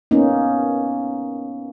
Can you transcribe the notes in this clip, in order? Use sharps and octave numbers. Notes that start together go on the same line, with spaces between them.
A#3 B3 C#4 D#4